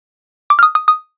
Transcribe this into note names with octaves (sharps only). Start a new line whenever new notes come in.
D6
F6
D#6
D#6
D#6